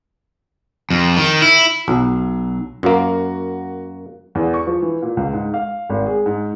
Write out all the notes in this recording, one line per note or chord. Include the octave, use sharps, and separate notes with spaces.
F2
D#3
E4
B1 F#3
F#2 A#3 F#4
E2
C#6
F3
E3
A#2
C#2
G#2
F5
G#1
G#4
G#2